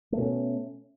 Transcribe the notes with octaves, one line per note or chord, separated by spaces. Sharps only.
B2 A3 A#3 C#4